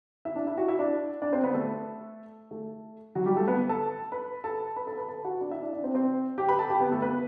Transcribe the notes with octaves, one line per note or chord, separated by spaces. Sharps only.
E4 E5
D4 D5
E4 E5
F#4 F#5
E4 E5
D4 D5
D4 D5
C4 C5
B3 B4
A3 A4
A3 A4
F#3 F#4
G3 G4
A3 A4
B3 B4
A4 A5
B4 B5
A4 A5
B4 B5
A4 A5
B4 B5
A4 A5
F#4 F#5
D4 D5
E4 E5
D4 D5
D4 D5
C4 C5
C4 C5
G4 G5
B4 B5
A4 A5
G4 G5
B3 B4
A3 A4
B3 B4